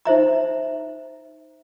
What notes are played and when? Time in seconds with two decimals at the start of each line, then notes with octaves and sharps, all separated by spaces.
0.05 D#4 C5 E5 A#5